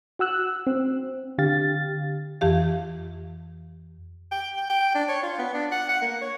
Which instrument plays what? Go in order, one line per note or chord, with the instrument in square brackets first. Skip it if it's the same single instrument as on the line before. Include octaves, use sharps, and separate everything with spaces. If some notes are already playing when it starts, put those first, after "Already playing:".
[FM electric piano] F#4 F#5 E6 F#6
C4
D3 G4 F5 A6
[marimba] F2 E3 G4 F5
[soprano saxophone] G5
G5
G5
D4
C#5
F4
B3
D4
F#5
F#5
A#3
C#5